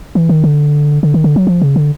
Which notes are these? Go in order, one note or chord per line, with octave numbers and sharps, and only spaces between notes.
E3
D#3
D3
D3
D#3
D3
F#3
F3
C#3
D3